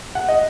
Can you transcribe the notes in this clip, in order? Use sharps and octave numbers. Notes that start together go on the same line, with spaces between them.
F#5
D#5